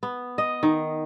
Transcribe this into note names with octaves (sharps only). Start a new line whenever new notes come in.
B3
D#5
D#3